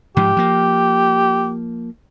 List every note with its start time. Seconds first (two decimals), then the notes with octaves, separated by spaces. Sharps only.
0.17 G#2 F3 G4
0.37 F3 A#3